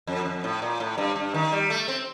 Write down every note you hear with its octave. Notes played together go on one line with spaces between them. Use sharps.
F2
F2
A2
A#2
A2
G2
G2
D#3
G3
A3
C4